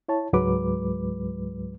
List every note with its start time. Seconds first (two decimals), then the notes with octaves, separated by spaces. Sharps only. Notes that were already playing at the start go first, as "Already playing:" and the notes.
0.09 E4 C#5 A5
0.33 C#2 G#2 F#3 G#3 B4 D6